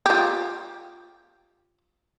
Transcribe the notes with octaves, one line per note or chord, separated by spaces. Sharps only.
F4 G4